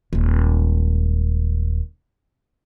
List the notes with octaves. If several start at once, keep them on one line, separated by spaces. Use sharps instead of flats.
D#1 G#3